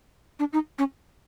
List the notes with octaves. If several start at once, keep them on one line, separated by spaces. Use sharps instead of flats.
D4
D#4
C#4